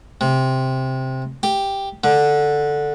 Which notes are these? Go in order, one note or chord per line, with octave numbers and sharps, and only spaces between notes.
C3
G4
D3